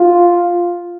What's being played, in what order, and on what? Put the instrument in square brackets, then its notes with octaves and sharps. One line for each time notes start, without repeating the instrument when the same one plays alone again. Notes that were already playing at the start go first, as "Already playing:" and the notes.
Already playing: [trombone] F4